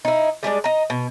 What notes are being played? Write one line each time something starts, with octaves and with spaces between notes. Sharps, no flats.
D#4 E4
G3 G#3 D4 D5
D#5 A#5
B2